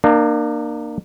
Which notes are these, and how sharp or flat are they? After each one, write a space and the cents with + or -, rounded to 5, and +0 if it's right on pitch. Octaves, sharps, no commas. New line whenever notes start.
A#3 +0 D4 +40